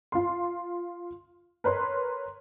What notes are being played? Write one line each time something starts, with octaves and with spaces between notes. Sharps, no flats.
F4 C6
A#4 B4 C#5 C6